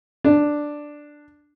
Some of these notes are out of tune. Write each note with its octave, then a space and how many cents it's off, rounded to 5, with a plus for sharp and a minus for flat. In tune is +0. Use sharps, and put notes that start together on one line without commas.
D4 +5